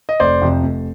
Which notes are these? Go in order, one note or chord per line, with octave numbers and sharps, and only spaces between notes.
D#5
F1 C5 D5
F2 C3
F1